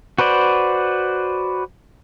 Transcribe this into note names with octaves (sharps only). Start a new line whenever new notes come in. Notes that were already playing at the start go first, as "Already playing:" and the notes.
F#4 B4 C5 D5